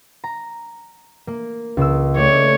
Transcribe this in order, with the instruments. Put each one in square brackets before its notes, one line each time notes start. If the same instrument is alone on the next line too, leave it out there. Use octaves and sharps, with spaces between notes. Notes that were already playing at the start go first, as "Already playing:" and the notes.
[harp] A#5
A#3
C#2 E6
[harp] A3 D5 [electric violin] C#5